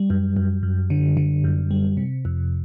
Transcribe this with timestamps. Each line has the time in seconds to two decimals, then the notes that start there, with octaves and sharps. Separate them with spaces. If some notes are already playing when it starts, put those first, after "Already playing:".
Already playing: G3
0.10 F#2
0.36 F#2
0.63 F#2
0.90 D3
1.17 D3
1.44 F#2
1.71 G3
1.97 C3
2.25 F2